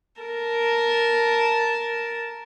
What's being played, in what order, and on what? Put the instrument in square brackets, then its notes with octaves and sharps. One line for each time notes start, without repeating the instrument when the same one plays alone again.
[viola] A#4 A5